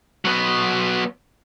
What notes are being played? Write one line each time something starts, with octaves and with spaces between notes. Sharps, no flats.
F#3 B3